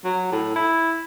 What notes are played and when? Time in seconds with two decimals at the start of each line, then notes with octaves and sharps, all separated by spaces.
0.04 F#3
0.32 A2
0.56 E4